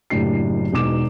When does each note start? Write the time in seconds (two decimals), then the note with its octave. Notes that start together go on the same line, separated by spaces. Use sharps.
0.10 F#1 F#2 A2 D4 G4 C7
0.72 E1 B2 D#4 D6 E7